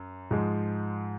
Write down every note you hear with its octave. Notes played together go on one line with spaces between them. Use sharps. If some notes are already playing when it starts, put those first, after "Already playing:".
Already playing: F#2
G#2 F3 G#3